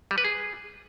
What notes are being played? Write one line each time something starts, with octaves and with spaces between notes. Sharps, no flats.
G3
B4
G#4